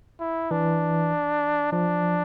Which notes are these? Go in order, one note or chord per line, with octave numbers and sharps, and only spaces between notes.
E4
E3 D4
F3 D4